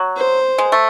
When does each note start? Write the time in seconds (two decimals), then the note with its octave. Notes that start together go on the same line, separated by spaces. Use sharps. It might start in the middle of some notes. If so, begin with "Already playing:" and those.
Already playing: F#3
0.17 C5
0.58 G#3
0.72 A3